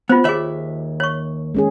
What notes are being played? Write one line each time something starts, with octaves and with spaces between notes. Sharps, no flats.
B3 F4 C5
D#2 G#4 C#5 E5
C#5 C#6
G#3 C#4 G#4